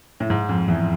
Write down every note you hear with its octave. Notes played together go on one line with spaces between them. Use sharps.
A2
G#2
F2
E2